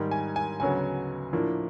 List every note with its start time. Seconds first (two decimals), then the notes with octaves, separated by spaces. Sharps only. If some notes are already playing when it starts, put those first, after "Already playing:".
Already playing: G#2 D#3 G3
0.11 G#5
0.36 G#5
0.60 D2 C#3 F#3 B3 G#5
1.33 A2 F3 A#3 D4